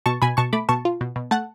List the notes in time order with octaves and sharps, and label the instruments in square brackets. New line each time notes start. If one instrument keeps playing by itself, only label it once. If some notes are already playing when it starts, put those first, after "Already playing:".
[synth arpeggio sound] B2 A5 C#6
B2 G#5 B5
B2 A5 C#6
A3 B5 D6
B2 A5 C#6
F4
B2
B2
A3 F#5 A5